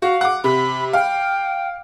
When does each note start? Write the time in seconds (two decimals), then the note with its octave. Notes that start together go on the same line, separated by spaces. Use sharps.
0.02 F#4 F5
0.21 F#5 D6
0.44 C3 B5
0.93 F5 G5